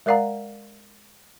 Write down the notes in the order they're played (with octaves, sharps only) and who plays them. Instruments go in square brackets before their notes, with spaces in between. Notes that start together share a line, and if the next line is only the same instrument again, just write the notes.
[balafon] G#3 A#4 D5 F5 F#5 A#5